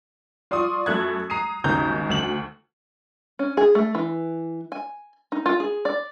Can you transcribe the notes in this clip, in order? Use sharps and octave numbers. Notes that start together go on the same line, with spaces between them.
F4 D5 C6 C#6 D#6
F#2 A3 F#6 G#6
A#5 D#6 C7 D#7
G#1 D#2 C#3 G#3 A#5 G6
D2 E7 F#7
C#4
G#4
A3
E3
G#5
D#4
F4
G#4
D5